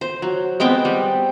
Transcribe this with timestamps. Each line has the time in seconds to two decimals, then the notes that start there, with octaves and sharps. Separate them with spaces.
0.01 C5
0.22 F#3
0.60 G#3 B3 C4 G5
0.85 G3